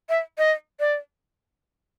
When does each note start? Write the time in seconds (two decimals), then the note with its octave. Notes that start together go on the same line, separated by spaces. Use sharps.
0.09 E5
0.38 D#5
0.80 D5